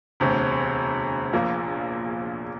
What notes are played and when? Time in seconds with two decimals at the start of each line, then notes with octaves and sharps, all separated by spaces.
0.20 E1 D2 C3
1.33 A#1 A#2 F3 A#3